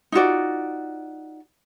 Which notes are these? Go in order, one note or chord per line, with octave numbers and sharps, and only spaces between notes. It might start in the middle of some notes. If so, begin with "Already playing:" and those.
D#4 F4 F#4 D5